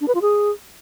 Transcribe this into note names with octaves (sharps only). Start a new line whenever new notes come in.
D4
B4
F4
G#4